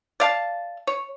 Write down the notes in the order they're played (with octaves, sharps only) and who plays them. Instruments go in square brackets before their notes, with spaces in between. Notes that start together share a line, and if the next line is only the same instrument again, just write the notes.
[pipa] D5 F5 A5
C#5